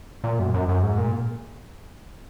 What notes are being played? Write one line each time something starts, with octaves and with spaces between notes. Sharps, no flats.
A#2
F#2
F#2
F#2
G#2
A#2